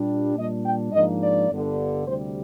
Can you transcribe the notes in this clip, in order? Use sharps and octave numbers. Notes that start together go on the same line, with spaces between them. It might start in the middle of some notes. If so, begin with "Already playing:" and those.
Already playing: A#2 G3 D4
A#2 G3 D4 D#5
G5
G#2 F3 A#3 D4 D#5
D5
G1 G2 D3
D2 C3 G3 C5